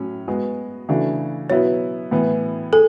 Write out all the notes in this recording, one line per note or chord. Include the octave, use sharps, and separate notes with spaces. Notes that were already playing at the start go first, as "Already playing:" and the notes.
Already playing: A2 F#3 C#4
G#3 B3 F#4
C#3 E3 A3 D4 F#4
B2 F#3 B3 E4 C#5
A2 E3 B3
G#4 A4